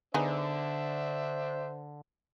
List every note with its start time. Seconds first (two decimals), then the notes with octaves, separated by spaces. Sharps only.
0.14 D3 B3 D4 D#4 G#4 C5 E5